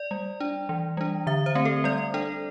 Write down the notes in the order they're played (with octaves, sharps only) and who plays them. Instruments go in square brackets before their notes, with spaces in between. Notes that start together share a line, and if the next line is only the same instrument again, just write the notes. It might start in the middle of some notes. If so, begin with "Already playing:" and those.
Already playing: [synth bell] D5
G3
D4
E3
G3 D4
D3 E5
C5
A3 C4
A4
G3 D5
D4 A4